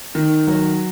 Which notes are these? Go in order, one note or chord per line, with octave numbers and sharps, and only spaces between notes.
D#3
F#3